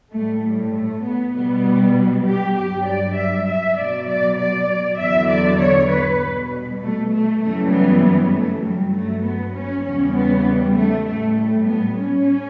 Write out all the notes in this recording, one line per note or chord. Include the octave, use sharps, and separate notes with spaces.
A2 G3 A3
G3
A3
B3
B2 G3 B3
G4
G2 F#3 G4
D5
E5
E5
B2 F#3 D5
D5
D5
E2 D3 F#3 E5
D5
C#5
B4
B2 G3
A3
A3
F#2 C#3 E3 G3 A3
B3
B3
A3
G2 F#3 G3
A3
B3
C#4
E2 C#3 G3 C#4
B3
G3
A3
A2 G3 A3
A3
B3
C#4